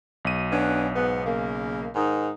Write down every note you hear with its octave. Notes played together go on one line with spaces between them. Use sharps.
B1 D#7
B3 C#4 D4
G#2 B3
C#3 A#3
G#2 D#3 D#4